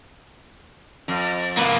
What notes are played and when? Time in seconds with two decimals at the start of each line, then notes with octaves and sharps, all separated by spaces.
1.08 F2
1.57 A#3 B4